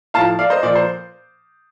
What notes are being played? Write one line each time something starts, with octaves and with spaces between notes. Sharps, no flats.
A2 F3 F5 A5
D5 F5
C5 D#5
A#2 F3 D5
C5